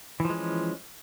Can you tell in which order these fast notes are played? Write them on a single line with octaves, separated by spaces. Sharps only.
E3 F3 G#3 C#4